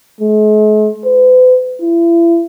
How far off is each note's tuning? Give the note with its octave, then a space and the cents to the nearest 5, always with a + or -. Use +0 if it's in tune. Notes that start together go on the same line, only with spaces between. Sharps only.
G#3 +45
B4 +45
E4 +35